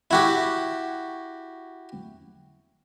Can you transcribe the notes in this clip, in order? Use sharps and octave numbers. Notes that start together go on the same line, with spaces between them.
E4 F#4 G4